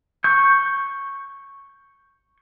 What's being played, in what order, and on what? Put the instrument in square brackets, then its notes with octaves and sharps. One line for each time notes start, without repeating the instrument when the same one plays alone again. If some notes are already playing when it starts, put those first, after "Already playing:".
[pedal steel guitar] C#6 G6